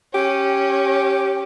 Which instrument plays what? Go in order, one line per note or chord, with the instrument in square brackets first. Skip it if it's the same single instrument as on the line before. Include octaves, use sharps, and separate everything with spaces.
[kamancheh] C#4 [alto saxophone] G4